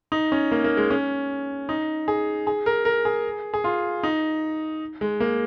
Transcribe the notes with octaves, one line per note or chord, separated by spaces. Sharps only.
D#4
C#4
A#3
A#3
G#3
C#4
D#4
G#4
G#4
A#4
A#4
G#4
G#4
F4
D#4
G#3
A#3